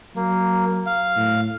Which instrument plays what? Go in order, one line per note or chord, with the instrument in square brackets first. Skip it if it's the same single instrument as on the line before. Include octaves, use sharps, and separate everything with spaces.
[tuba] F#3 [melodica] A#3
[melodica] F5
[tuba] A2